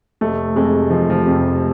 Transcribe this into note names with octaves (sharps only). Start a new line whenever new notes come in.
F1 A3
F2 C3 G#3
F1 F3
F3
F2 C3